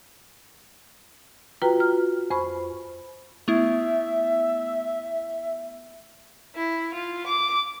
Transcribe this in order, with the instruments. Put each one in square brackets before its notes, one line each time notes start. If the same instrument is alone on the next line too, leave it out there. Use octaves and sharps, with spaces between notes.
[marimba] F4 F#4 B4 G5 A#5
F6
F2 C5 B5 C#6
[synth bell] A3 B3 E4 [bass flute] E5
[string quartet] E4
F4
D6